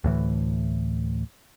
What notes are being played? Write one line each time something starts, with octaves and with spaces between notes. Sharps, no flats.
D2 A2 E3